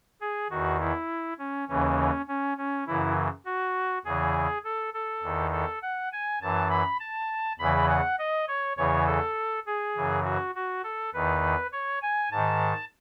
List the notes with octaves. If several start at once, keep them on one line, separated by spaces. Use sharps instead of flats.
G#4
E2 D#3 F#4
E4
C#4
D#2 C#3 E3 C#4
C#4
C#4
F#2 C#3 E3 E4
F#4
E2 C#3 E3 G#4
A4
A4
E2 D#3
A4
F#5
G#5
F#2 E3 A5
B5
A5
E2 C#3 E3 B5
F#5
D#5
C#5
E2 C#3 E3 C#5
A4
G#4
F#2 C#3 E3
F#4
F#4
A4
E2 D#3 B4
C#5
G#5
G#2 D#3 A5